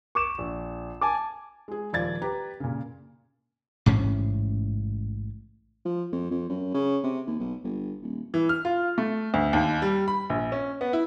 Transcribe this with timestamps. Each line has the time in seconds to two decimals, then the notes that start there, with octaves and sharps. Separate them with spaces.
0.15 C#6 D6 E7
0.38 A#1
1.01 G#5 A5 D6
1.68 G#3 G#4
1.93 D#1 F3 D5 G#6 A6
2.22 G4 B4 A#5
2.60 A#2 C#3
3.86 A1 G#2 C3 C#4
5.85 F3
6.12 F2
6.31 F2
6.49 F#2
6.74 C#3
7.04 C3
7.27 D#2
7.40 B1
7.64 G1
8.03 D#1
8.34 E3
8.49 F6
8.65 F4
8.98 A3
9.34 D2
9.53 D#2
9.82 G3
10.08 B5
10.30 A#1
10.52 C#4
10.81 B3
10.93 E4